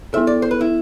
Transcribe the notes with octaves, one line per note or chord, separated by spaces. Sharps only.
B3 E4 A4 E5
D5
C5
B4
E4